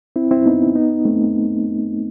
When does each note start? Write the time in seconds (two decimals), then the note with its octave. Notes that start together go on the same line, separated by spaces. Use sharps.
0.16 C4 E4
0.31 C4 E4
0.46 B3 D#4
0.75 B3 D#4
1.05 A3 C4